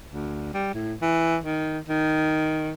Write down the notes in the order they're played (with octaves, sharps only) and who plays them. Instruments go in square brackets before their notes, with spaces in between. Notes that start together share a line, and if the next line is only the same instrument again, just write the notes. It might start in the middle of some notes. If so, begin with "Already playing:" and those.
[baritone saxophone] D2
G3
A2
E3
D#3
D#3